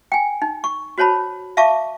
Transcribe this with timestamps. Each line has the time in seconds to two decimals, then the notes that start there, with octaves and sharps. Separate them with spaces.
0.12 G5 G#5
0.42 D#4
0.64 C#6
0.98 F#4 C5 C#5 A5 B5
1.57 E5 F5 A5 C#6 D6